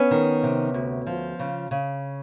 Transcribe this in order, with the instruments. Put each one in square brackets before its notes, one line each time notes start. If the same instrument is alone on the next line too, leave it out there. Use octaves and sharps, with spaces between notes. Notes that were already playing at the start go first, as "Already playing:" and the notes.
Already playing: [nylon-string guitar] B3 C#4
D#3
C3
D2
F3
C#3
C#3